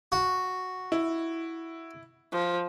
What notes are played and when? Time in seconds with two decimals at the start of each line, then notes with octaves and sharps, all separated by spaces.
0.12 F#4
0.92 E4
2.32 F3